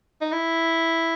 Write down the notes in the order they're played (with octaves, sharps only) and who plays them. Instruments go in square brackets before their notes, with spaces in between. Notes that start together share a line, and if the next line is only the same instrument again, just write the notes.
[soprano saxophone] D#4
E4